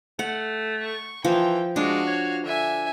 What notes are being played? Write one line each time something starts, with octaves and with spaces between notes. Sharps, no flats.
A3 F#5
C#6
E3 F3 G5
G#3 D4 F#4 F5
C#5
D3 E5 G#5